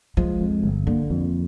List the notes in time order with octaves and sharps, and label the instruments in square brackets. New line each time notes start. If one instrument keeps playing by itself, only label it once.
[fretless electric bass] F3 [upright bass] G#3
[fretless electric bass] F2
G1
[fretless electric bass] D3 [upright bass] A#3
[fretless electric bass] F2